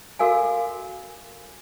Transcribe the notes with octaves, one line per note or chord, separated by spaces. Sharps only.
F#4 A4 A#4 F5 G#5